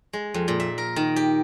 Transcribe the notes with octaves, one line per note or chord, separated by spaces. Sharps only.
G#3
F2
A#2
E5
A#4
D#3
G4